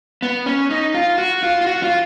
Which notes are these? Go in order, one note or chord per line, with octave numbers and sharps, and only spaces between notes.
B3
C#4
D#4
F4
F#4
F4
F4
F#4
F4